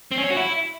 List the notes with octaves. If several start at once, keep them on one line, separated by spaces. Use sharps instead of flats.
C4
C#4
C#5
F#4
E4